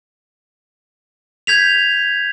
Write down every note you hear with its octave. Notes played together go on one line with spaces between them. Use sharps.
G6 G#6 B6 F7